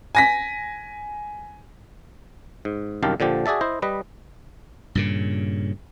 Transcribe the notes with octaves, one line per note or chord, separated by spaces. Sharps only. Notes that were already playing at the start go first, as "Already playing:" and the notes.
G#5 A#6 B6
G#2
C2 F#2 D#3 G4 F5 A5
A#2 D3 F3 G4
F#4 G#4 D5 E5 A5
E4 C5 D#5
G3 B4 D#5
G2 A#2 C#3